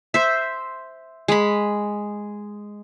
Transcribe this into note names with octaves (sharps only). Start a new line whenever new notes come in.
C5 E5
G#3 B5